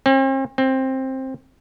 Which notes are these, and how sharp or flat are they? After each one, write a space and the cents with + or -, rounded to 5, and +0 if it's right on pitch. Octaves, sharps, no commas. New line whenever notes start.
C4 +45
C4 +15